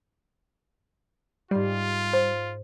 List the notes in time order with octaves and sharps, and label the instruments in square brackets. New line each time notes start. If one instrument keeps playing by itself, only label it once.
[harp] G#2 C7 [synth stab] G3 [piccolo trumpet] F4
[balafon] C5